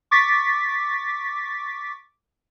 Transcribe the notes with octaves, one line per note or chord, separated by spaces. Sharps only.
C#6 D6 A6 B6